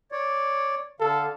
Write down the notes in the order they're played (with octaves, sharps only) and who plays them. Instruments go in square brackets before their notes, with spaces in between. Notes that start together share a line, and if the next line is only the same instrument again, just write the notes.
[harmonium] C#5 D5
[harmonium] D3 F5 [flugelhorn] A4